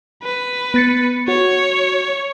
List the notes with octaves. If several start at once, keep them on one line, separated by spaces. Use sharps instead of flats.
B4
B3 A6 C#7
F#4 C#5